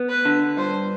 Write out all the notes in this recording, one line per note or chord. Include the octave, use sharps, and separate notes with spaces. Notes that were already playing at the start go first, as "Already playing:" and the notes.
Already playing: B3
B4
D3
G2 C5